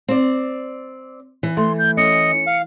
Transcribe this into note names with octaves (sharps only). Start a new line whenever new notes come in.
C4 D5
E3
A3 C6
G6
C#4 D#5 C#7
F5